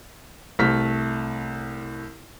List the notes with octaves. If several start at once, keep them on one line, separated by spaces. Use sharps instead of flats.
C2 A3 F6 B6